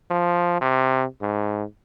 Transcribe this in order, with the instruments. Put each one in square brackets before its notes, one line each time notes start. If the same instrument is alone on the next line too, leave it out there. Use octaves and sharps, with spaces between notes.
[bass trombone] F3
C3
G#2